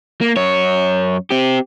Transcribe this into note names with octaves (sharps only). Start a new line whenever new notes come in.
A#3
F#2 C#5
C4 G4